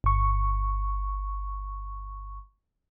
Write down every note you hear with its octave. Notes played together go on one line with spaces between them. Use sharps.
G1 C#6